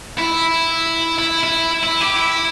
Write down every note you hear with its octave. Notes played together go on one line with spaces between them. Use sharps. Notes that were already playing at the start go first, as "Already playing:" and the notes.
E4
E4
E4
E4
G4
E4